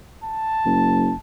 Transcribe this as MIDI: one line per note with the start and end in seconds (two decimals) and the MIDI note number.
0.23 1.18 81
0.65 1.12 30